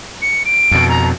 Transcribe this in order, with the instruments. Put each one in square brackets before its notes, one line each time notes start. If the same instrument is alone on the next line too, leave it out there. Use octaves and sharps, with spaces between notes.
[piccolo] C#7
D7
[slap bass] F2 B2
[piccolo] A#5